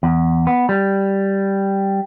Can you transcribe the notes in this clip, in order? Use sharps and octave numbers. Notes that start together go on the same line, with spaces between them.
E2
B3
G3